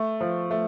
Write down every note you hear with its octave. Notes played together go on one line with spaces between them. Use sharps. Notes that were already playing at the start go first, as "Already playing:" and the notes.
Already playing: A3
F3
A3